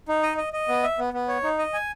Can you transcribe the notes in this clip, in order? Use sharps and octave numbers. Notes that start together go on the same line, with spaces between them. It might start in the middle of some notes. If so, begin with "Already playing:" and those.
D#4
D#5
D#5
D#5
B3
E5
B3
B3
C#5
D#4
D#5
G#5